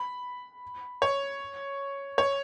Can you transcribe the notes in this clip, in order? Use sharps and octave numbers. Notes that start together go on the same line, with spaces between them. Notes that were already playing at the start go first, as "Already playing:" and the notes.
Already playing: B5
C#5
C#5